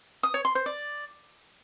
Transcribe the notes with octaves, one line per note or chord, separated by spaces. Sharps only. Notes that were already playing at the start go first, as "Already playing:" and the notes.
D#6
C#5
C6
C5
D5